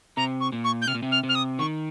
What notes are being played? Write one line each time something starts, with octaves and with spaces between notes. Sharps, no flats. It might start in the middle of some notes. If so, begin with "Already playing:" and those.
C3 A#5
C#6
A#2
C#6
G6
C3 F6
A#2
C3
F6
C3
F6
D#6
D#3 C#6